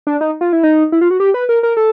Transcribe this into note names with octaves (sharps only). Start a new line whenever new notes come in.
D4
D#4
F4
E4
D#4
E4
F4
F#4
G4
B4
A#4
A#4
A4